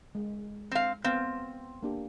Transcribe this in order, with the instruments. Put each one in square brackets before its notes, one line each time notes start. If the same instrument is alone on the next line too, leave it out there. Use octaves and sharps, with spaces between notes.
[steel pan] G#3
[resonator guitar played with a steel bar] C4 F5
[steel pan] B3 F5 [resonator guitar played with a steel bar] C4
[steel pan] A#3 D4 G4